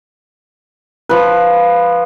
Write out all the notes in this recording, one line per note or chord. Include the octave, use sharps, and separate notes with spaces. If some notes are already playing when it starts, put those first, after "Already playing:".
F3 B4